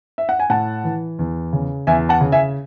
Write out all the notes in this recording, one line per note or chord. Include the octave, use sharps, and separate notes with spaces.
E5
F#5
G#5
A2 F#5 A5
E3
E2
C#3
E2 E5 G#5
F#5 A5
C#3
E5 G#5